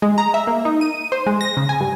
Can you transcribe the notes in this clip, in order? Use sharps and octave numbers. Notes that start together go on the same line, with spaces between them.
G#3
A#5
E5
A#3
D#4
D#7
C5
G#3
A#6
C#3
G#5
G2